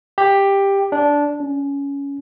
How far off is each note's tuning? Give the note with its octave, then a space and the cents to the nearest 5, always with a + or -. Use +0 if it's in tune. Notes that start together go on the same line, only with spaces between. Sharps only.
G4 +10
D4 -10
C#4 +15